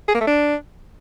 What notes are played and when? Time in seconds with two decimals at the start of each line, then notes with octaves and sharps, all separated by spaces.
0.08 G#4
0.15 A#3
0.21 A3
0.27 D4